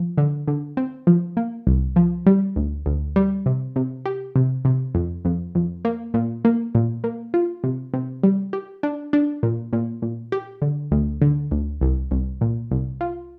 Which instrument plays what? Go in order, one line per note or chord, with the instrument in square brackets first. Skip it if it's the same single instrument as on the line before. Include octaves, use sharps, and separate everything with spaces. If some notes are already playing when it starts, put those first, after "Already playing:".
Already playing: [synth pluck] F3
D3
D3
C4
F3
A#3
C2
F3
G3
D2
D2
G3
C3
C3
G4
C3
C3
F2
F2
F2
A#3
A#2
A#3
A#2
A#3
F4
C3
C3
G3
G4
D4
D4
A#2
A#2
A#2
G4
D3
D2
D3
D2
C2
C2
A#2
C2
F4